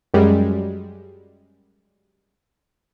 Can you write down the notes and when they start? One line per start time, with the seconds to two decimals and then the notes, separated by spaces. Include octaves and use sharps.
0.14 F#2 G3 G#3